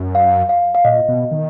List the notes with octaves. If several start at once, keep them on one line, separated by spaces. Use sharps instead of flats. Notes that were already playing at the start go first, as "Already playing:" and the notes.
Already playing: F#2
F5
F5
F5
A#2 D#5
B2
D#3